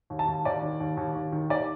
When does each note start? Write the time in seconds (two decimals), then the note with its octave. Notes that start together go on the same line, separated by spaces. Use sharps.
0.10 D#2
0.19 A5
0.28 D#2
0.45 D#2 D5
0.62 D#3
0.80 D#2
0.97 D#2
1.15 D#2
1.32 D#3
1.50 D#2 D5